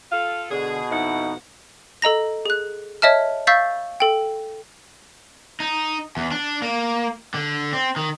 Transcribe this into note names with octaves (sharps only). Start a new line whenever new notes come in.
F4 A4 F5
B2 D3 G#4
F2 D#4 E4 F#5
A4 D#5 A#5 A#6
G#4 F#6
C#5 D#5 E5 A5 F6
F5 C#6 E6 G6 A6 B6
A4 G5
D#4
E2
D4
A#3
D3
C4
D#3